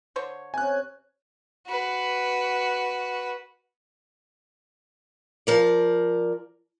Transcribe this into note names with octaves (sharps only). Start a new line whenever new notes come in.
D3 C5 C#5
C3 C#4 G#5 F#6
F#4 B4
F3 A#4 D5